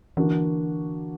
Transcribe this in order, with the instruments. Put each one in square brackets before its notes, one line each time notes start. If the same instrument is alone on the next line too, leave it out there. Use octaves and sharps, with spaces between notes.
[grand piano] D3 A#3 D4 F#4 [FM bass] E3